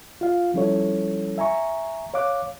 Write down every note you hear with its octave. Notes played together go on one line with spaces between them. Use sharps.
F4 F5
F3 G3 C#4 E4 A4 C#5
E5 G#5 A#5 C#6
C#5 F5 D6 F#6